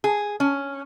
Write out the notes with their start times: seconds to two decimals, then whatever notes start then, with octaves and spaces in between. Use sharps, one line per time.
0.04 G#4
0.40 C#4